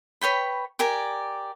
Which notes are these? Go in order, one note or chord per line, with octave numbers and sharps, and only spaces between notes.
B4 C#5 G5 B5
G4 A#4 D5 G#5